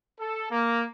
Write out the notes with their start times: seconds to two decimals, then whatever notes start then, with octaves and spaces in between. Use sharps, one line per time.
0.19 A4
0.50 A#3